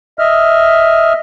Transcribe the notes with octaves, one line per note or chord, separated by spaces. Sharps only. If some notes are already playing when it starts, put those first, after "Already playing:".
D#5 E5 F6